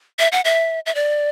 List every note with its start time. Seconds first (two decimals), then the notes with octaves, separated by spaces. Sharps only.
0.19 E5
0.32 F#5
0.45 E5
0.86 E5
0.95 D5